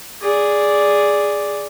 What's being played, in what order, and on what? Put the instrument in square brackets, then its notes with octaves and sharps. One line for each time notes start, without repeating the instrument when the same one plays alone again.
[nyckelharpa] G#4 D5